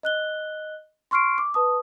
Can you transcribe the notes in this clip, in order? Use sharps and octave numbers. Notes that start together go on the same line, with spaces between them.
D#5 F#6 G7
C6 C#6 F6 C7 D7
D6
B4 A5 D#6